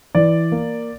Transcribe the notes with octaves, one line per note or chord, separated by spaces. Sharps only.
E3 D5
A#3